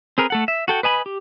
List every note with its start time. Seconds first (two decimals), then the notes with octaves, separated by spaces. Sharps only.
0.18 C4 G#4 A#4 B4
0.30 A3 A4 F#5
0.48 E5
0.68 F#4 A4 G5
0.83 B4 D#5 G#5 B5
1.06 G4